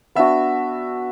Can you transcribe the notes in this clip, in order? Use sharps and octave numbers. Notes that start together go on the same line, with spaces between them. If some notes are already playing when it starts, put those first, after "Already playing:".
B3 D4 F#4 E5